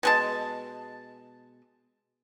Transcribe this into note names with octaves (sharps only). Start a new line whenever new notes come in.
B2 G#3 A5